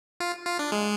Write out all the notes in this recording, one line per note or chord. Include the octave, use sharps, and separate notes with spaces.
F4
F4
D4
G#3